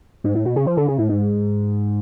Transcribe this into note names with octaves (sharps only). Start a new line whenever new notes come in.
G#2
A2
B2
C#3
F3
D3
C#3
A2
G#2